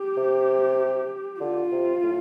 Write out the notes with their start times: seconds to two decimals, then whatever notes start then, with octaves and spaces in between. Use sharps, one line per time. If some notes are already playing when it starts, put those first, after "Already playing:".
Already playing: G4
0.17 C3
1.41 D3 F4
1.72 C3
2.03 A2